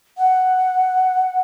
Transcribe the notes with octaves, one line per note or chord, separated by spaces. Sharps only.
F#5